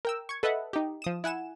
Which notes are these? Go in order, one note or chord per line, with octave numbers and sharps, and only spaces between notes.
A#4 G5 E6
C#6 G#6
A4 B4 D#5 E5 F#5
D#4 G4
F3 D#6 E7
E4 F#5 G#5 E7